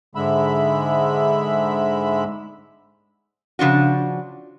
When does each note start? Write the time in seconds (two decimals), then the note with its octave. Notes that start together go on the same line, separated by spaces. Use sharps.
0.15 G#2 D3 G#3 E5 B5
3.59 C#3 F3 D4 F#4